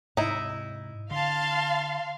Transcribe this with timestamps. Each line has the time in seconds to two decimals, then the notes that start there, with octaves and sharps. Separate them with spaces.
0.17 G#2 C3 D#4 E4
1.11 D3 F5 A5 C6